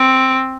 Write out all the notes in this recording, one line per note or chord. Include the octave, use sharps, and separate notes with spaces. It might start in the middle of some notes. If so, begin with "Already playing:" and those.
Already playing: C4